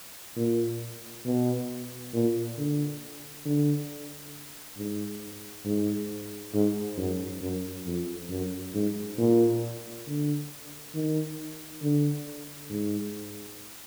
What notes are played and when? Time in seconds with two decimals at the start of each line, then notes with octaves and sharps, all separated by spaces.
0.36 A#2
1.25 B2
2.13 A#2
2.57 D3
3.45 D3
4.77 G#2
5.65 G#2
6.54 G#2
6.97 F#2
7.41 F#2
7.86 F2
8.30 F#2
8.74 G#2
9.18 A#2
10.07 D3
10.94 D#3
11.82 D3
12.70 G#2